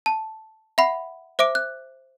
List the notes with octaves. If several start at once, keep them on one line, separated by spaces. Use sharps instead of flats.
A5
E5 F#5 B5 C7
C5 E5 D6 D7
F#6